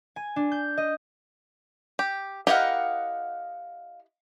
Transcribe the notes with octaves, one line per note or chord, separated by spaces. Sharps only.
G#5
D4
G6
D#5
G4
E4 G4 A#4 D#5 F5 F#5